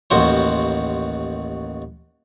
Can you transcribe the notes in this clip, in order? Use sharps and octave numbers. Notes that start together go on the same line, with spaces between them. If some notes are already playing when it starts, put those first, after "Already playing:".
A1 D#2 F#4 C5